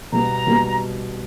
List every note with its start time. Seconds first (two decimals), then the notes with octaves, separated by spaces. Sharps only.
0.12 B2 G3 B3 A#5
0.47 B2 G3 B3